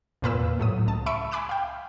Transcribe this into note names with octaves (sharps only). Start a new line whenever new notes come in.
E2 A#2 B4 E6
A2 F#3 D#6
C#2 A5
E5 B5 C#6 E6 C#7 D7
G#5 B5 D6 F#6 E7
F5 G5